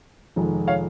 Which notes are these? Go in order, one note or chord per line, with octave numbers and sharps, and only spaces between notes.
F1 F2 D#3 G#3
C#5 F5